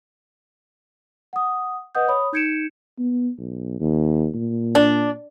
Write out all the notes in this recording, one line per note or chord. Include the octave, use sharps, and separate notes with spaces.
F#5 D#6
B4 D#5 F#5 D#6 G6
C#5 B5 D#6
D#4 G6 G#6 C#7 D7 E7
B3
B1
D#2
A#2
D4